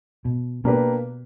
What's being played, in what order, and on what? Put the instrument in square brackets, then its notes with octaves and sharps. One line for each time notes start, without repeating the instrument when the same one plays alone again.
[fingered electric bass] B2
[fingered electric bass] B2 [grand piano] A#3 D4 G4 B4